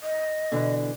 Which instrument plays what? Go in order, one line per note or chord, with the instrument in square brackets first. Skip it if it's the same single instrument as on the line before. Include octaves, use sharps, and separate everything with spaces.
[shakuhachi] D#5
[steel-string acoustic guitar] B2 D3 E3